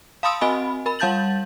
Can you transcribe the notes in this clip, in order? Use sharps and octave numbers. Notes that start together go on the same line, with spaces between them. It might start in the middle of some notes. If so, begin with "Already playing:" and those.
F5 A5 B5 C6 D#6 E6
C4 F#4 D#5 G#5 B5
A#4 B5
G3 F5 A5 G6 A6 F#7